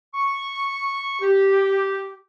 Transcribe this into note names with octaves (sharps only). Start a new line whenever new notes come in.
C#6
G4